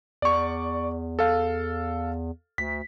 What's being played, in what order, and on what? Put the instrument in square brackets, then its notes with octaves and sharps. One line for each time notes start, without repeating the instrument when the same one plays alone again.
[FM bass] E2 [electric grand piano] D5 C#6
[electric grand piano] A4 F5
[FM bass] D2 [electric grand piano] B6